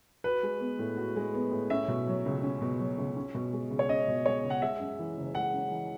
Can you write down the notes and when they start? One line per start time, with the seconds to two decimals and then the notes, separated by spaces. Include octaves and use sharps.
0.24 F#4 B4
0.43 G#3
0.60 B3
0.79 A2
0.97 F#4
1.16 G#3
1.34 B3
1.51 A2
1.70 C#4 E5
1.88 B2
2.07 F#3
2.26 C#2
2.43 C#4
2.62 B2
2.79 F#3
2.98 C#2
3.16 C#4
3.35 B2
3.53 G#3
3.70 C#2
3.79 C#5
3.89 C#4 D#5
4.08 B2
4.26 G#3 C#5
4.45 C#2
4.50 F#5
4.62 G#3 E5
4.80 F#2
4.99 E3
5.18 F#1
5.35 G#3 F#5
5.54 F#2
5.71 E3